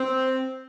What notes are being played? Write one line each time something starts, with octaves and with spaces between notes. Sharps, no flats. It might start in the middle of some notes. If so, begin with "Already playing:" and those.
Already playing: C4